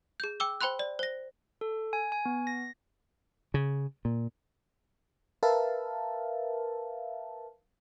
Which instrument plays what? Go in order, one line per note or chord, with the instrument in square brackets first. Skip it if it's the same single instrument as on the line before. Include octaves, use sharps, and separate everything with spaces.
[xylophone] G#4 G6
G5 D6 E6 G7
C5 G5 B5 C6 F#6
D5
C5 A#6
[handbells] A4
G#5
G#5
B3
A#6
[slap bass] C#3
A#2
[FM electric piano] A#4 B4 E5 F5 A5